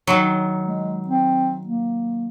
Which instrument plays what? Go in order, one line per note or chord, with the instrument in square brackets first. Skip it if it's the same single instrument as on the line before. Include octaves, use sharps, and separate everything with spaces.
[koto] D#3 F#3
[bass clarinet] G#3
C4
A#3